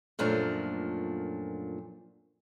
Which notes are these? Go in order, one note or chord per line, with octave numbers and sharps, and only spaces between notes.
F#2 A#2 F3 A3 D4